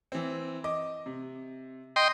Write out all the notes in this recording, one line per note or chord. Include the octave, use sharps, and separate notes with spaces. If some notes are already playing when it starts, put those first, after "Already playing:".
E3 C4
D#5 D6
C3
D#5 G5 C6